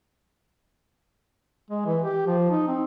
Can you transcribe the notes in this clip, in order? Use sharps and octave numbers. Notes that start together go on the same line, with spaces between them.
G#3
E3
G4
F3
D#4
C4